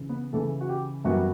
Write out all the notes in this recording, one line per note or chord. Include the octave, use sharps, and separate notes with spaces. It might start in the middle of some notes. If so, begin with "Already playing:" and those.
Already playing: C#3 E3
B3 B4
C#3 E3 A3 A4
F#4
G4
F#2 E3 G3 B3 F#4